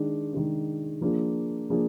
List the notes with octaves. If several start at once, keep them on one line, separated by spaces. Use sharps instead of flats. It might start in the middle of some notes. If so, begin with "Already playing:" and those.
Already playing: D#3 G#3 D4
D#3 G#3 D4
F3 A#3 D4 G#4
F3 A#3 D4 G#4